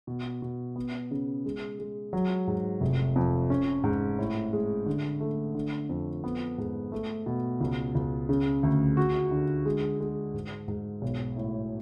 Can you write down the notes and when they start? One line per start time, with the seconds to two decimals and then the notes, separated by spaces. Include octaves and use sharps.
0.07 B2
0.42 B2
0.76 B3
1.11 C#3
1.45 G#3
1.79 G#3
2.13 F#3
2.48 G#2
2.81 F1
3.16 F2
3.50 C#4
3.84 G#2
4.19 A2
4.53 G#3
4.86 D3
5.21 A3
5.55 D3
5.89 F2
6.24 B3
6.58 G#2
6.92 A3
7.26 B2
7.61 C#2
7.95 C#2
8.29 C#3
8.63 D2
8.97 F#4
9.31 D3
9.66 G#3
10.00 G#3
10.34 G#2
10.68 G#2
11.02 B1
11.36 A2